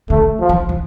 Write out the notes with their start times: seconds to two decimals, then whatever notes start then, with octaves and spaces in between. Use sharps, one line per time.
0.10 D3 A3
0.40 F3
0.49 E3
0.69 E3